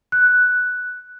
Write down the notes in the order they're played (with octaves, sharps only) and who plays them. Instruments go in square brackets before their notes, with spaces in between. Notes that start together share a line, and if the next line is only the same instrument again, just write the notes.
[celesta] F#6